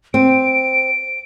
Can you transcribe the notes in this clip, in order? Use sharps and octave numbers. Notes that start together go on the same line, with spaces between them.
C4 D7